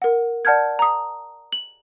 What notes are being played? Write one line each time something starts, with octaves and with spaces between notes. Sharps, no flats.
A#4 F#5
D5 F#5 A5 F6 G6 G#6
A#5 D#6
F#7